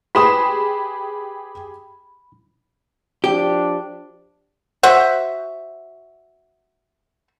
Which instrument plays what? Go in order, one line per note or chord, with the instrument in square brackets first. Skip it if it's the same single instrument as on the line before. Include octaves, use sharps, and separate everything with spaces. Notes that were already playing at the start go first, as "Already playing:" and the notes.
[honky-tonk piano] G4 G#4 E7 [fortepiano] B4 C6 D#6 [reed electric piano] B5
[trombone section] F3 D4 [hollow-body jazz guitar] G4
[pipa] F#4 C5 E5